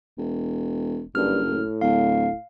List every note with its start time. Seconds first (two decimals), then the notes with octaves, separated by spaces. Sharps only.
0.18 E1
1.15 F#1 G2 F6
1.48 A2
1.81 D1 F5